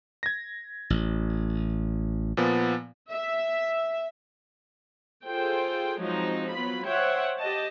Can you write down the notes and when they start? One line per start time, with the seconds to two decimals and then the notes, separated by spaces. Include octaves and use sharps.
0.23 G#6 A#6
0.90 A1
2.37 A#2 F3 B3
3.11 E5
5.26 F4 G#4 A4 C5 G5
6.01 F3 F#3 G#3 C4 D#4
6.52 F#3 B3 F4 B5
6.86 C5 C#5 E5 F#5 G5
7.39 G4 D#5 A5